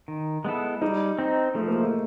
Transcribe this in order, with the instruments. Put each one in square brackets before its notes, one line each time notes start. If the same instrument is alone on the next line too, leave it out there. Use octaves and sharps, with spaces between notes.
[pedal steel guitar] D#3
G#3 B3 E4 A4
[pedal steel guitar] G3 [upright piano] D#4
[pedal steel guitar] C4 D#4
[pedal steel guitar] F3 [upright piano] A3
[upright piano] A#3
A3